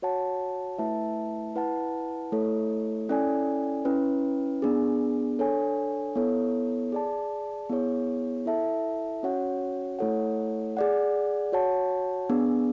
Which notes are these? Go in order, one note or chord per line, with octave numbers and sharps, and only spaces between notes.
F#4 C#5 F#5 A5
A3 E4 B4 E5 A5
E4 B4 F#5 A5
A3 E4 A4 C#5
C#4 E4 A4 D5 G#5
C#4 E4 B4
B3 D4 G#4
D4 A4 C#5 G#5
B3 E4 A4 C#5
G#4 D5 A5
B3 E4 G#4 C#5
E4 A4 E5 A5
C#4 F#4 C#5 F#5
A3 E4 A4 C#5 F#5
G#4 D5 F#5
F#4 C#5 F#5 A5
B3 D4 G#4